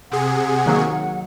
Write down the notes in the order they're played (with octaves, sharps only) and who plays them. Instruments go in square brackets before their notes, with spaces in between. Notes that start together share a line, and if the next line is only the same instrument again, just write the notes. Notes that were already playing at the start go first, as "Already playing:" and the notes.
[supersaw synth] C3 G#4 [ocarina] F#5
[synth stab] D#3 F#3 A#3